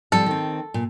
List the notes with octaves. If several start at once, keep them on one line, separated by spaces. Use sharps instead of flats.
F3 G3 C4 A4
D#3 C4
A#2